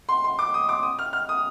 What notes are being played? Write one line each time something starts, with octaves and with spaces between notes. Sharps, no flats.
C6
C6
D6
D#6
D6
D#6
F6
F6
D#6